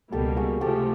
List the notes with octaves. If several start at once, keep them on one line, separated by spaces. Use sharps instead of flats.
C#2 B2 G3 A#3 G4 A4
F#4 G#4
C3 F3 A3 G4 A4